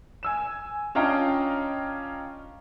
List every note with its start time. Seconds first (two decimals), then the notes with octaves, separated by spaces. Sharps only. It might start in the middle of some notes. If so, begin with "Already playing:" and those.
0.23 G#5 E6 E7
0.95 C#4 D4 F4 D#5 G5 A#5